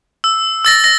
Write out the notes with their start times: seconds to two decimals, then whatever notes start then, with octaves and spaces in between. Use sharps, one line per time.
0.24 E6
0.65 E6 A6 A#6
0.84 A#6